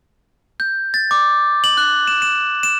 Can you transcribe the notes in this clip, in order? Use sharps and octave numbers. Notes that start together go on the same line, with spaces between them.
G6
A6
D6
F#7
F#6
E7
E7
E7